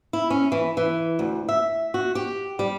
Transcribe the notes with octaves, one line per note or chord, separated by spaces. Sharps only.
E4
C#4
E3
E3
D2
E5
F#4
G4
G3